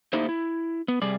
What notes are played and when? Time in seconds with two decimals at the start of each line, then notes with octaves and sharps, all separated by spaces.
0.13 A3 A#3 D#4 E4 G4 C5
0.29 E4
0.88 B3
1.02 C3 G3 G#4 D5